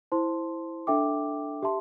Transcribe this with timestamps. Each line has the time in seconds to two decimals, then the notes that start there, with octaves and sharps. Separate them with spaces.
0.12 E4 C5 A5 C6
0.87 D4 A4 E5 G5 D6
1.62 G4 E5 A5 C6